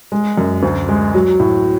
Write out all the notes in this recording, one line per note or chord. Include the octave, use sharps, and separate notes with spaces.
G#3
F#2
D2
G#3
F#3
A2